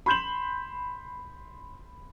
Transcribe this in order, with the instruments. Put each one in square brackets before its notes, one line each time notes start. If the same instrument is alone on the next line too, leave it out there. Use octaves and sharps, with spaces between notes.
[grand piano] B5 C6 G6 E7 F#7